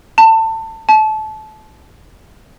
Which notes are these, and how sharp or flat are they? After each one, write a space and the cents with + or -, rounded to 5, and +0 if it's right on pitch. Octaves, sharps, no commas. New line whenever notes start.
A5 +25
A5 -25